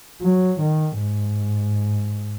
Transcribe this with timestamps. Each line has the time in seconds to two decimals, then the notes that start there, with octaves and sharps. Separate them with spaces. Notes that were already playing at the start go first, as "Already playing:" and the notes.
0.22 F#3
0.61 D#3
1.00 G#2